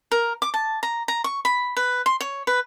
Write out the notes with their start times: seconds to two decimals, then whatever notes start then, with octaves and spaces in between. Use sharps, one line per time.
0.12 A#4
0.42 D6
0.54 A5
0.83 A#5
1.08 A#5
1.24 C#6
1.45 B5
1.77 B4
2.06 C6
2.21 C#5
2.47 B4